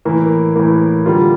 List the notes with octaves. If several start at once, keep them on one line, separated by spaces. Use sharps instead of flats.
A2 E3 A#3
A2 E3 A#3
D3 G3 A#3 F4